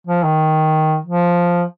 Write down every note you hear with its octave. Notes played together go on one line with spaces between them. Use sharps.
F3
D#3
F3